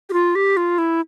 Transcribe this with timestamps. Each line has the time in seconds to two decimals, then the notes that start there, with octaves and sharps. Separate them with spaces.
0.09 G4
0.13 F4
0.35 G4
0.57 F4
0.78 E4